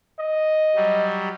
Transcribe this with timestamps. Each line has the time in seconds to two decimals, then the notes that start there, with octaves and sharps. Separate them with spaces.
0.20 D#5
0.75 F#3 G3